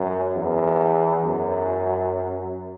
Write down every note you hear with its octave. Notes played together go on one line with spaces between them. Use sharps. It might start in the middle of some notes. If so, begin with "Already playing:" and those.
Already playing: F#2
E2
F#2